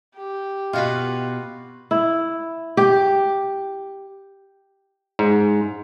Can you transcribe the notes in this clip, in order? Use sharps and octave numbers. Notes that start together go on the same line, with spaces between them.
G4
B2 F4 F#4 B4
E4
G4
G#2